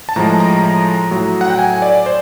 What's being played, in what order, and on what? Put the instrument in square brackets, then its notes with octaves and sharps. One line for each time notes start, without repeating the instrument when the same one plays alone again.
[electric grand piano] A5
A2 F3 G#3 A#5
A#5
A#5
A2 F#3
F#5
G5
G#5
D5
C5